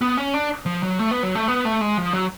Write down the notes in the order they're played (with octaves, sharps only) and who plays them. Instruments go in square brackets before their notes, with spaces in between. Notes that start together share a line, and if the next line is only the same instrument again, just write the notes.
[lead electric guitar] B3
C#4
D4
F3
F#3
A3
B3
F#3
A3
B3
A3
G#3
F3
F#3